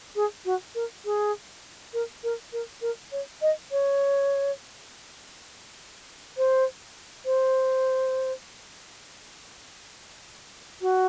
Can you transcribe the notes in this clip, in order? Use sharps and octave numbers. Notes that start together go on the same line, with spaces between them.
G#4
F#4
A#4
G#4
A#4
A#4
A#4
A#4
C#5
D#5
C#5
C5
C5
F#4